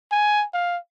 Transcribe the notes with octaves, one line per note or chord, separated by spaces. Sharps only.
G#5
F5